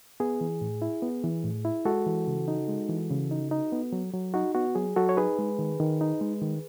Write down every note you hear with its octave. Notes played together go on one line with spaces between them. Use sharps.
B3 G#4
E3
A2
E4
B3
E3
A2
E4
G#3 F#4 A4
E3
C#3
D#4
G#3
E3
C#3
D#4
D#4
B3
F#3
F#3
D#4 F#4
B3 F#4
F#3 G#4
F#3 F#4 A4
C#5
D#4 G#4 B4
G#3
D#3
D#3
D#4
G#3
D#3